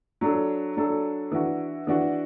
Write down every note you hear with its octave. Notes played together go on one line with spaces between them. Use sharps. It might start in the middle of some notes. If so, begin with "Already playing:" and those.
F#3 D4 A4
F#3 D4 A4
E3 D4 F#4
E3 D4 F#4